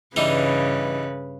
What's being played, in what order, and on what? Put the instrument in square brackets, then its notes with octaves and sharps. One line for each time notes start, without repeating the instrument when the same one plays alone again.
[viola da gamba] G2 C#3 B4 [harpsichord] E3 G3 D#4